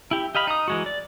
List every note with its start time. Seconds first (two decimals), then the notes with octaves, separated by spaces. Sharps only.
0.11 E4 G4
0.35 G4 D#5 F5 B5
0.47 D#4 D#6
0.68 E3 G#3 F#4
0.86 D5